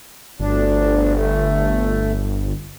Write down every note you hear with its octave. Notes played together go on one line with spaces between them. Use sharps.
G1 D2 D4
A3